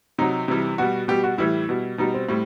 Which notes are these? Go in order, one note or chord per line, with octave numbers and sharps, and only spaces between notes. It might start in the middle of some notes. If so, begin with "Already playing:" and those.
C3 F#3 D#4
C3 E3 G3
B2 G3 F#4
B2 G3 G4
F#4
A2 E3 G3 E4
B2 G3
B2 G3 D#4
C4
A2 G3